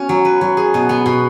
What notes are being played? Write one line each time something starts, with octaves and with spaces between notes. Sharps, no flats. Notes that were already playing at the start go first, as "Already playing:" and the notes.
Already playing: B3 C#4 F#4
F#3
B4
F#3
G#4
B2
B3
B2